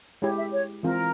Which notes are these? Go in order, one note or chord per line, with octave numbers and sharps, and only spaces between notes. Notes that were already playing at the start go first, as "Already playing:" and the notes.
G#3 E4 G4 C#5
E5
C#5
E3 G#3 C4 F4 A#4